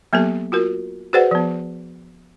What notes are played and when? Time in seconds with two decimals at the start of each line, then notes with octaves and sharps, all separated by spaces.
0.13 F#3 A#3 B3 G4 A4
0.52 F4 F#4 A#4
1.13 F#4 G#4 B4 C5 D5 F#5
1.31 F3 B3